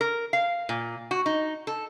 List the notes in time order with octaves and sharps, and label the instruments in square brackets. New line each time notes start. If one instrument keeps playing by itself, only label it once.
[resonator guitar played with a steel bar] A#4
F5
A#2
F#4
D#4
A4